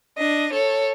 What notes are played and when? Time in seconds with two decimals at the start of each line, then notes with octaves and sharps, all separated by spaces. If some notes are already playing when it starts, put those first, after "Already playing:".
0.18 D4 D#5
0.52 A4 C#5